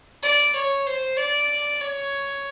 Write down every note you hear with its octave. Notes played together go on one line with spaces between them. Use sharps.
D5
C#5
C5
D5
C#5